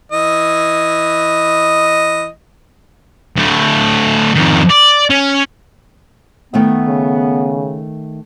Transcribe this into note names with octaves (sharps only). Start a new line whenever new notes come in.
E3 D#5
D2 A2
F2 D#3
D5
C#4
D#3 A3 B3 E5
C#3